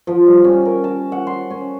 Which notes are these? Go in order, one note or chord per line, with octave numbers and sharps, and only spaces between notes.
F3
G3
C#4
A#4
A5
F#5
C6
C#4